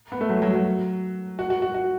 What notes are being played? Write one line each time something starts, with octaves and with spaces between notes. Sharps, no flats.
B3
A3
F#3
F#3
F#3
F#4
F#4
F#4
F#4